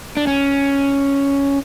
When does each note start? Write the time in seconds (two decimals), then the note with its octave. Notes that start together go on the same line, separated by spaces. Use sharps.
0.17 D4
0.27 C#4